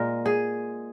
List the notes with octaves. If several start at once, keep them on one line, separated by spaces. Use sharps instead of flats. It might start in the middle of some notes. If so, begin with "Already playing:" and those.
Already playing: A#2 G#3 A#4
G#4